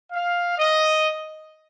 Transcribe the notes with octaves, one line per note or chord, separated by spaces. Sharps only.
F5
D#5